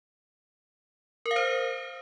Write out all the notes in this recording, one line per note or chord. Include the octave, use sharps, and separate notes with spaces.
A#4
F5
C5